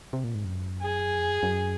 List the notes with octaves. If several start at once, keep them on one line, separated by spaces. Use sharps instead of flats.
C3
A#2
G#2
F#2
G#4
F2
F#2
F#2